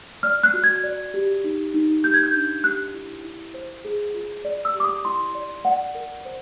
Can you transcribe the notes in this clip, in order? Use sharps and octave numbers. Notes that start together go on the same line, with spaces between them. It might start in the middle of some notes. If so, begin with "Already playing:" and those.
D5 F6
F#6
F#4
G#6
D5
G4
D#4
D#4
G4 G6
G#6
G6
D4
G4 F#6
E4
E4
C5
G#4
F4
D5
E6
G4
D6
D#6
E4 C6
D5
D5 F#5
A#4
C5